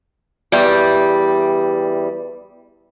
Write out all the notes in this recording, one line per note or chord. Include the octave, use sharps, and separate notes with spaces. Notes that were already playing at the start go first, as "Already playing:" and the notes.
E2 G3 G5